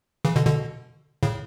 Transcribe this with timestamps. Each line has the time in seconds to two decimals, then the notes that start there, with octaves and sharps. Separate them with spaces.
0.25 C#3 E3
0.36 B2 D3
0.47 B2 D3
1.23 A2 C#3